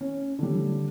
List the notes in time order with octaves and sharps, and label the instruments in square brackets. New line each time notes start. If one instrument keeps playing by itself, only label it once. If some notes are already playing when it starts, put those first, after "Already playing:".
[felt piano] C#4
D3 G3